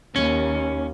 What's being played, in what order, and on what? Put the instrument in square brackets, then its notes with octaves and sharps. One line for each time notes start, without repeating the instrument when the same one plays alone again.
[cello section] D#2 [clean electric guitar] C#4